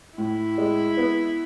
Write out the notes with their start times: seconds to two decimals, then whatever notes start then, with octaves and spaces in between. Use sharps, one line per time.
0.18 A2 E4
0.58 G#3
0.97 B3